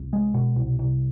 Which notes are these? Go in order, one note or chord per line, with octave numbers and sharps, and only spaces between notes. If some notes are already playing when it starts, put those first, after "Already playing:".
Already playing: C2
G#3
B2
C2
C2